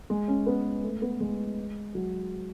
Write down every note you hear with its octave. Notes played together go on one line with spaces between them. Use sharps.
G#3
C#4
B3
A3
B3
G#3
F#3